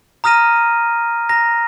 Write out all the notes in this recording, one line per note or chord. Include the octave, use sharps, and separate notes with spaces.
A#5 D#6 F6 A#6 D#7
A#5 A#6